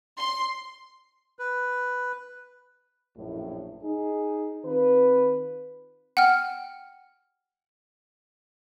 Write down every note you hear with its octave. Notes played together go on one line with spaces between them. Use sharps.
C6
B4
A#1 F#2 A2
D#4 G#4
D#3 C4 F4 B4
F#5 G5 F6